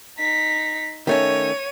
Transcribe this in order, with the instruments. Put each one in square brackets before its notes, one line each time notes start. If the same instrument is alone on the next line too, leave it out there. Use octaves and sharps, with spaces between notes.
[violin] D#4 B6
[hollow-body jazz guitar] D#3 A3 C#4 [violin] C#5 D#7